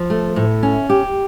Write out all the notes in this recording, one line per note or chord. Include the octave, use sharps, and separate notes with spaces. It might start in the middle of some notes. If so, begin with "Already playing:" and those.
Already playing: F3
A3
A2
C#4
G4